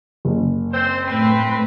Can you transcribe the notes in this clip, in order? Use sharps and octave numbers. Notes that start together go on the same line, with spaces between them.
F#1
C4 C5
A2 C4 B4